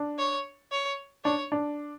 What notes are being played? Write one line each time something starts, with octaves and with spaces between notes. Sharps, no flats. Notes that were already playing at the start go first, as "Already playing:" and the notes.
Already playing: D4
C#5
C#5
D4 C#5
D4